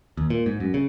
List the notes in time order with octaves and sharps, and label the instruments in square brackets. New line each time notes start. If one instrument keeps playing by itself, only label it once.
[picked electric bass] D#2
A#2
G#2
F#2
C#3